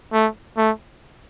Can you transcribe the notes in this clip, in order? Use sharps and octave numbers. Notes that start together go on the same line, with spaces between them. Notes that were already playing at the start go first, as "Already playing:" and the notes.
A3
A3